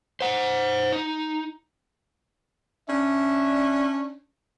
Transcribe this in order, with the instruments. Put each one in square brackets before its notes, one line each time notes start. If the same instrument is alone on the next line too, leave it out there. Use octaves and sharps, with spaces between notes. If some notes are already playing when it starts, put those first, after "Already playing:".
[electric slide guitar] C5 F#5
D#4
[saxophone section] C#4 D4 [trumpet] E5